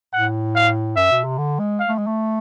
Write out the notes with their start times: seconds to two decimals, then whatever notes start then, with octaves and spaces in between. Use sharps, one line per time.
0.13 A2 F#5
0.56 F5
0.97 F#2 E5
1.11 B2
1.24 C3
1.38 D3
1.59 G#3
1.80 F5
1.89 A3
1.98 G#3
2.07 A3